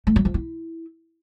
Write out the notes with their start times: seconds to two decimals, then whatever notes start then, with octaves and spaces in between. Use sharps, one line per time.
0.07 A3
0.16 F#3
0.25 F3
0.34 E4